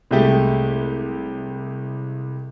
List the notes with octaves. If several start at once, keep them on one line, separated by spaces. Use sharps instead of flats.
C2 G#3 A3 G4